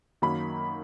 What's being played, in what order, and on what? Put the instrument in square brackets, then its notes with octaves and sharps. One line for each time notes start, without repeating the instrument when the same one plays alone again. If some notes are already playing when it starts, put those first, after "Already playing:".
[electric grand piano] F#2 D#3 F#3 A#3 D#4 [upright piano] B5